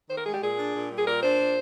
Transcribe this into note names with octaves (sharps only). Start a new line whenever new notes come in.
D#3 C5
A#4
G#3 G#4
G4
A#2 G#4
D4
A#2
G3
G#4
A#2 A#4
D4 C5
A#2